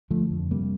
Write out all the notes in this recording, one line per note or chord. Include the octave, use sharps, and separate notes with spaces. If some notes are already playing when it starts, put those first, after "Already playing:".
D3 F3 A3
F2
C3 G3 A#3